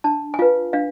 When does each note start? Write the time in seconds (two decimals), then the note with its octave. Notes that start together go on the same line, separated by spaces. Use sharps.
0.04 D4 A5
0.34 G#5
0.39 F4 B4 F5
0.73 D4 F5